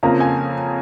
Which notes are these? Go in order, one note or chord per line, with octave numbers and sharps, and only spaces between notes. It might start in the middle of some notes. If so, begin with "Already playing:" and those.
F2 C#3 F3 A#3 A#5
G#5